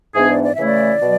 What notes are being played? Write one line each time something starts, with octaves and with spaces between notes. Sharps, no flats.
G#2 E3 B3 D4 G#4
D5
D5
C#3 E3 A3 E4 E5
D5
B2 F#3